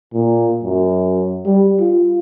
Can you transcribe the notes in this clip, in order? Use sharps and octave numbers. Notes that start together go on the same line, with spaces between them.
A#2
F#2
G3
F4